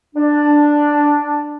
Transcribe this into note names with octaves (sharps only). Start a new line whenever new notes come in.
D4